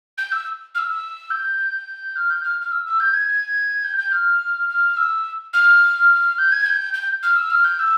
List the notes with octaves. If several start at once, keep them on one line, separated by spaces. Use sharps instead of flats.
G6
E6
F6
E6
G6
F6
G6
F6
F6
E6
E6
G6
G#6
G6
G6
F6
F6
E6
F6
G6
G#6
G6
G6
F6
E6
F6
G6
E6